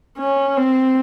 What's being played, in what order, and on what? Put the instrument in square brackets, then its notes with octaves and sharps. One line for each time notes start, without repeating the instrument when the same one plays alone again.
[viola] C#4
C4